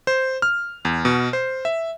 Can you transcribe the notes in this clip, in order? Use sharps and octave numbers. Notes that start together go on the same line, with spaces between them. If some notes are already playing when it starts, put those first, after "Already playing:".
C5
F6
E2
B2
C5
E5